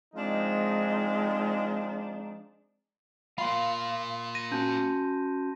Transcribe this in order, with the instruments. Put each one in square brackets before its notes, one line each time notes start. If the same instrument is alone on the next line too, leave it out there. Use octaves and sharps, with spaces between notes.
[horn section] F3 G#3 C4 D4 D#4
[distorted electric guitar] A#3 F4 [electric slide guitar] F5 [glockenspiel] B5 C6
[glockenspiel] A#6 D#7
[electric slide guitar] C#4 F#4 [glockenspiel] A5 G6